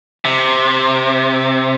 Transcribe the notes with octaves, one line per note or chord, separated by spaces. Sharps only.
C3